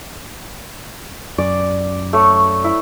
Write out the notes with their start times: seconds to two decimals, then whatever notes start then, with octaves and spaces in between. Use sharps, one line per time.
1.38 F#2 D5
2.13 A3 C#5
2.64 E4